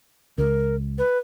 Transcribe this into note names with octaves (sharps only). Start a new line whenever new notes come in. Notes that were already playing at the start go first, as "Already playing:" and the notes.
C#2 A#4
B4